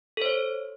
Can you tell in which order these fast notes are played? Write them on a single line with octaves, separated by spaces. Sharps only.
A4 C5 C#5